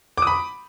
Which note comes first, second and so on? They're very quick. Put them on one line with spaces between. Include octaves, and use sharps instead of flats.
D6 D#6 B5